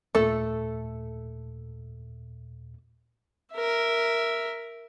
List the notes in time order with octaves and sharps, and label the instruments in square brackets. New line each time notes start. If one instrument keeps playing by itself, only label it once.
[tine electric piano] D#2 A#2 [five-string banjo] A3 [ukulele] A4
[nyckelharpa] A#4 E5